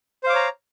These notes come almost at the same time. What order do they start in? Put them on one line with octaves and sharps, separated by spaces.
C5 F5 D6 C#5 A#5